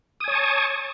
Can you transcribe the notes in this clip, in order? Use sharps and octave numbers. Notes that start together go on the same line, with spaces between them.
C#5 G#5 A5 C#6 D#6